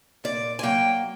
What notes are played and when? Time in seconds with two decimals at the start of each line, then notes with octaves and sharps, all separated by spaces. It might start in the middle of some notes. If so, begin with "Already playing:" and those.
0.24 A#2 D5
0.59 G#5
0.63 F#3 A#3 G5